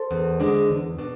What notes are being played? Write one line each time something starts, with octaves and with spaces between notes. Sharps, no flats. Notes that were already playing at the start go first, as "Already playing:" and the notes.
Already playing: A4 C5
E2
D3 G#3 D4
E2
B2 B3 D4